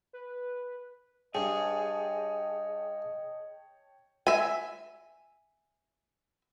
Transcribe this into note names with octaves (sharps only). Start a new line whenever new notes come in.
B4
G2 G#4 C#5 D#5 G5 A5
E5 G#5